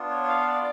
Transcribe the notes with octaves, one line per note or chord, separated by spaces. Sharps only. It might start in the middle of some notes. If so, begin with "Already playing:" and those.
Already playing: B3 D4 F4
C#5
F5
F5
D5